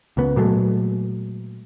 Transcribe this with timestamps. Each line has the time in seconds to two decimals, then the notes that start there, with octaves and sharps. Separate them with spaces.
0.17 C#2 C#3 B3
0.36 A#2 F#3 G#3 A3